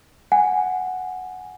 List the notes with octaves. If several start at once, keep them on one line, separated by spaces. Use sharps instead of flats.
F#5 G#5